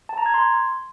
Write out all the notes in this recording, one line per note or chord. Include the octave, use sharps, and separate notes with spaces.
A5
A#5
G#6
C6